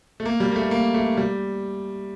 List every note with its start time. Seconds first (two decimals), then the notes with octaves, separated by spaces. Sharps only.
0.20 A3
0.25 A#3
0.40 G3
0.52 A#3
0.56 A3
0.71 A#3
0.94 A3
1.17 G3